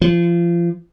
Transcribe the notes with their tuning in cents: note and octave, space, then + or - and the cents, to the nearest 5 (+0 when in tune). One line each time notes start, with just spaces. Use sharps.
F3 -30